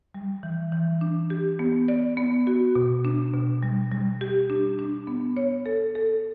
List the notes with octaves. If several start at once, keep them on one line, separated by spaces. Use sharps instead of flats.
G3
E3
E3
D4
G4
B3
D5
B3
F#4
B2
D4
B2
G3
G3
G4
D4
D4
B3
C#5
A4
A4